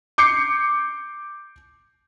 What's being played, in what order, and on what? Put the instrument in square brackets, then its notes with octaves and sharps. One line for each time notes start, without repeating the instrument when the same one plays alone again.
[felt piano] D6 G6 C7 C#7